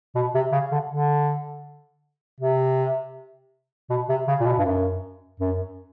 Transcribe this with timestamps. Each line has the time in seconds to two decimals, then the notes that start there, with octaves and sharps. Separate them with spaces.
0.15 B2
0.35 C3
0.52 C#3
0.72 D3
0.90 D3
2.41 C3
3.90 B2
4.09 C3
4.28 C#3
4.41 A#2
4.46 B2
4.59 G2
4.65 F#2
5.40 F#2